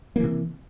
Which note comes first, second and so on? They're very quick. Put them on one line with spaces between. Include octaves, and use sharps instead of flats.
A#3 E3 C3